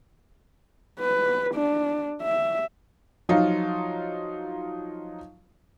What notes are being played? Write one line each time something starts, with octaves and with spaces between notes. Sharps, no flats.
B4
D4
E5
F3 F#3 D#4 F4 F5